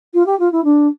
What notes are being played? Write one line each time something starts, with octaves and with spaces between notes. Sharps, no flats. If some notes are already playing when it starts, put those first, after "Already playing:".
F4
G4
F4
E4
D4